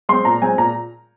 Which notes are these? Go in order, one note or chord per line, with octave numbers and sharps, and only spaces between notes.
G#3 C4 C6
A#2 A#5
G#3 C4 G#5
A#2 A#5